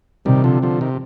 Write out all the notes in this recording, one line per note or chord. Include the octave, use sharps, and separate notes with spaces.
C3 D#3 G3
D3 F3
D3 F3
C3 D#3